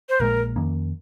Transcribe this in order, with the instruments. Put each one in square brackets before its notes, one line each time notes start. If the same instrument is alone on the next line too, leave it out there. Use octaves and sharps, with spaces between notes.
[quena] C5
[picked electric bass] A#1 A#2 G#3 [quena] A#4
[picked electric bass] F2 D#3 A#3 C#4